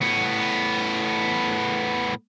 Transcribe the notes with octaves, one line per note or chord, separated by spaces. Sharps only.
A2 B3